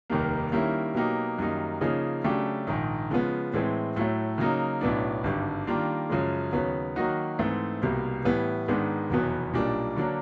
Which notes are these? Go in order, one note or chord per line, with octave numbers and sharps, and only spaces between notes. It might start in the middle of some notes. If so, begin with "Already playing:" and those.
F1 D#2 D#3 G3 A#3
D#3 G3 A#3 C#4 E4
B2 F#3 A#3 D#4 G4
F#2 D#3 G3 A#3 D#4
C#3 F3 A#3 D#4 G#4
C#3 F#3 A3 D4 G4
A#1 G#2 D#3
C#3 F3 G#3 B3
A2 E3 G#3 C4
A2 F#3 A3
C#3 F#3 A#3 D#4
B1 A2 F#3 B3 D4
G#1 G2 D3 G3
D#3 G3 A#3 D4 F4
F#2 C#3 F3 G#3
D#2 C#3 F#3 B3
D#3 F#3 A#3 D#4 F#4
G#2 E3 A3 C4
C2 B2 G3 A#3
A2 E3 G3 B3
G#2 D#3 G#3 B3 D4
F1 E2 B2 F#3 B3
B1 A#2 G3 A#3 D4
D3 F#3 A#3 D4